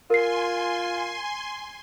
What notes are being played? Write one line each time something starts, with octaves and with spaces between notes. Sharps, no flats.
F4 A#4 G#5 C6 C7